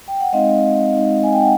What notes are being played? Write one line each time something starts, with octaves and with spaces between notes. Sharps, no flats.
G5
F#5
G#3 C4 D#4 D#5 F5
G#3 C4 D#4
G#5
G5
F#5